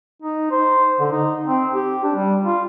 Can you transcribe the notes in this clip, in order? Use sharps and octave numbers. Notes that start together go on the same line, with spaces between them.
D#4
C5
D3
D#4
C4
G4
D4
G3
F4